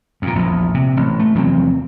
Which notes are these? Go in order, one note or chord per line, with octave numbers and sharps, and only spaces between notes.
F2 A#2
A#1 E2
C3
A1
A3
F1 E2 F#3 C4